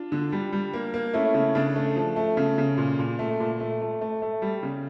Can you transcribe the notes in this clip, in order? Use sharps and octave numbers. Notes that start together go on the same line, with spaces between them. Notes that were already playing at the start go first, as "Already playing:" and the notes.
Already playing: D4 F4
D3
G3
G3
A#3
A#3
A3 C#4 E4
C#3
C#3 D4
A3
F3
A3
C#3
C#3
A#2
A#2
A3
A#2
A3
A3
A3
A3
G3
C#3